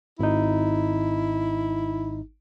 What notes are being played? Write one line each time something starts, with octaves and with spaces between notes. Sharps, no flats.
G#1 D#4 E4